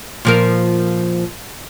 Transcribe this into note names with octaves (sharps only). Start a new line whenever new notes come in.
A#2 F3 A#4